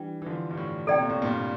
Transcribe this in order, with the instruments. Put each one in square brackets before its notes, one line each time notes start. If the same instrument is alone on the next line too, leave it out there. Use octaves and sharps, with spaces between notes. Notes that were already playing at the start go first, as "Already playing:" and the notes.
Already playing: [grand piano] E3 G3 [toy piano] D4 G5
[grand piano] E3
D3 F3
G2
A2
[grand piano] C3 [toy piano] A4 D5 G5
[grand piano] A#2
A2
G2 A#2